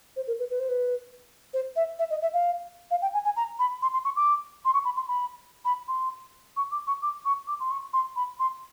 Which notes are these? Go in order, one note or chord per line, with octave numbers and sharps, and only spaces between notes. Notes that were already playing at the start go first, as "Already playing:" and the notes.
C5
A#4
B4
B4
C5
B4
C5
E5
E5
D#5
E5
F5
F5
G5
G#5
G#5
A#5
B5
C6
C6
C#6
D6
C6
C#6
B5
C6
B5
B5
C6
C#6
D6
C#6
D6
C#6
D6
C6
C#6
C6
B5
C6